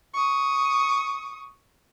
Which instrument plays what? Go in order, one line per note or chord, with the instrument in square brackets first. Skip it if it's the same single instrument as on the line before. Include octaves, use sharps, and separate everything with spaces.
[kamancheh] C#6 D#6